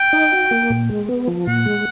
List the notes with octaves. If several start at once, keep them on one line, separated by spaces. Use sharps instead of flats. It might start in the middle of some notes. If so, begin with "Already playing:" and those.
Already playing: G5
D#4
F#4
A#3
A#2
G#3
B3
F3
A#2 F#5
G#3